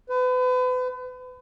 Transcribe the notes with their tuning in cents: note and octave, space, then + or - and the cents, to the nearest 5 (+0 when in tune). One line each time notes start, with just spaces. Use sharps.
B4 +35